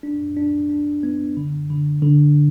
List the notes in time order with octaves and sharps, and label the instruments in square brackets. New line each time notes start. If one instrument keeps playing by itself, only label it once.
[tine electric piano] D4
D4
D4
B3
D3
D3
D3